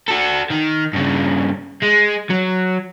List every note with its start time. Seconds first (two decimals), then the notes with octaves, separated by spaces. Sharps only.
0.08 F#4 A4
0.51 D#3
0.94 G2 C#3
1.83 G#3
2.30 F#3